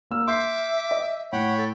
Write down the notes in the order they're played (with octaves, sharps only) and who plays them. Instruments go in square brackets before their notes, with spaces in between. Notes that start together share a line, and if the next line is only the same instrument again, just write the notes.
[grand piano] A#3 E6 F6
[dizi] E5 [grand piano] C6 G6 C7 [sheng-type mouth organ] D6
[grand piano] D#5
[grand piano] A2 [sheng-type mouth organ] C#5 G5 B5 [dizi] F#5
[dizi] A4